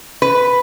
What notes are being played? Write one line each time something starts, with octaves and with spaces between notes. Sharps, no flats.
B4